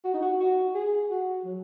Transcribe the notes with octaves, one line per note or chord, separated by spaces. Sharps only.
F#4
D#4
F#4
F#4
G#4
F#4
F#3